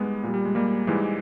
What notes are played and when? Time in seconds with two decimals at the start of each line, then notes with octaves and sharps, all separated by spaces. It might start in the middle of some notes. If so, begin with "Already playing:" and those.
Already playing: G#2 G3 G#3 B3
0.23 A#2 G3
0.34 G3
0.45 G#3
0.55 G3 A#3
0.87 G#2 E3 G3 G#3